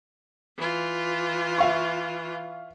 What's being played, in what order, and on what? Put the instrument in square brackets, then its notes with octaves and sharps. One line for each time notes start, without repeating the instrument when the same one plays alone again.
[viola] E3 F4
[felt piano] E5 F5 C#6